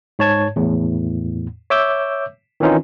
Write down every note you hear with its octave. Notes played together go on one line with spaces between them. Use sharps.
G#2 C#5 A5 G#6
E2 A2
C#5 E5 D6 E6 G6
D#3 E3 C4 C#4 D#4 F4